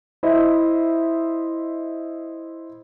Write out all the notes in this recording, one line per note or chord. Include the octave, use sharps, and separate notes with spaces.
E4 C5 D#5 E5